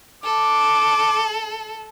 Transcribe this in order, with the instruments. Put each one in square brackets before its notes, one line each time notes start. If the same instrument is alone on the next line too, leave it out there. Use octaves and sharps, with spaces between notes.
[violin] A4 [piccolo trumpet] D6